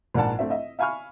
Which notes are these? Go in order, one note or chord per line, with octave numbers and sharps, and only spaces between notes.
A#1 G#2 A#3 D5 F#5 A5
A3 C4 D4 E5
D#5 E5
E5 F5 G#5 B5 C#6 F6